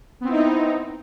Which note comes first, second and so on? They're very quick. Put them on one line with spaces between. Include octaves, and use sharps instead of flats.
B3 C4 E4 D#4